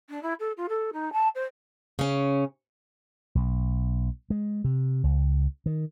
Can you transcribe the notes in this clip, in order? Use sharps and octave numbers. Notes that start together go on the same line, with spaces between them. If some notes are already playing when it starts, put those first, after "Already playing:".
D4
E4
A4
F4
A4
D#4
A5
C5
C#3 C#4
B1
G#3
C3
C#2
D#3